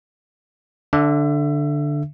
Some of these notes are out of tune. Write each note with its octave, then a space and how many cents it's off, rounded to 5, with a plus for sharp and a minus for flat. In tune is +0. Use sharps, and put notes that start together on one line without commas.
D3 +0 E5 +25